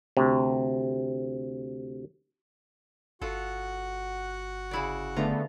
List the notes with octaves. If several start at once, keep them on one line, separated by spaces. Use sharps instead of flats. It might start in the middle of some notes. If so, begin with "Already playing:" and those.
D2 C3
G1 F4 F#4 A4 F#5
C#3 E4 D5
D3 A3 B3 F4 A#5